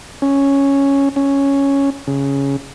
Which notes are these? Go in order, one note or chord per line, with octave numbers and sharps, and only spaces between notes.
C#4
C#4
C#3